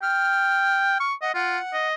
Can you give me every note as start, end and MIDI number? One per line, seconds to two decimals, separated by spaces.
0.02 0.96 79
0.02 1.04 89
1.00 1.14 85
1.22 1.32 75
1.22 1.32 78
1.34 1.58 65
1.34 1.87 78
1.73 1.95 75